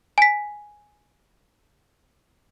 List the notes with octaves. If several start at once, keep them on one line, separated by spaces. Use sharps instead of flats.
G#5 B6